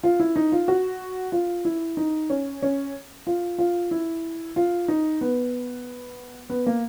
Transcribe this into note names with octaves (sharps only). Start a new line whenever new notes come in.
F4
E4
D#4
F4
F#4
F4
E4
D#4
C#4
C#4
F4
F4
E4
F4
D#4
B3
B3
A#3